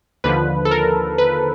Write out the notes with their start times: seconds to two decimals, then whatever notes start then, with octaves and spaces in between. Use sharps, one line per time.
0.24 D#2 D3 F3 B4
0.65 A4
0.71 A#4
1.18 B4